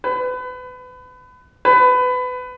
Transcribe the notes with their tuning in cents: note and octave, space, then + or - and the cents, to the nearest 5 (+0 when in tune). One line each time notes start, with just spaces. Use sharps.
B4 +30
B4 +25